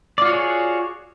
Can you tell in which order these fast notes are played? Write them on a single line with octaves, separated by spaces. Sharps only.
D5 F4 F#4 C#5 G#4